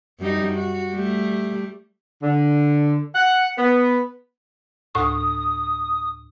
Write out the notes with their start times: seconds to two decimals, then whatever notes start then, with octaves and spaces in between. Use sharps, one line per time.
0.20 F#2 G3 D#4
0.53 F#4
0.91 G3 A3
2.23 D3
3.15 F#5
3.58 B3
4.95 D2 A2 C#6 D#6